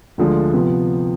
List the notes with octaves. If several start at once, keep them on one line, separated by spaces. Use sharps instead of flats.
D2 D3 F3 G#3
C3 F3 B3